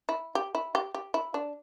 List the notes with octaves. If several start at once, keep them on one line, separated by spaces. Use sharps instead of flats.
E4
G4
E4
G4
G4
E4
D4